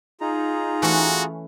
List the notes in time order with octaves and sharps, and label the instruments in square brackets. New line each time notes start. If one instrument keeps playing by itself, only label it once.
[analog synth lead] D#4 [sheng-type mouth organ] F4 G#4 A#5
[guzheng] E3 A3 C#4 [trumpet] F#4